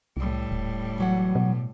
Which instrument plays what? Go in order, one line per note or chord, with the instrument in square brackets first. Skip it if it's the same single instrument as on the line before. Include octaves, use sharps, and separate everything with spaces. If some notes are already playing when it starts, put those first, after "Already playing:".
[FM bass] C2 [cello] A2 G3
[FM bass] D#1
[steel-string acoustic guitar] E3 F#3 F#5
[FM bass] B2